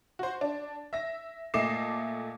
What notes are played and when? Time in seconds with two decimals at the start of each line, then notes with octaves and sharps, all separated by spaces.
0.19 F#4 C5
0.41 D4
0.93 E5 A#6
1.54 A#2 A3 D#5 D6 C7 E7